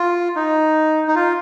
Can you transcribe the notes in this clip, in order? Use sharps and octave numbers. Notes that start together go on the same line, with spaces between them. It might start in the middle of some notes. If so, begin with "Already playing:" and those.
Already playing: F4
D#4
D#4
F4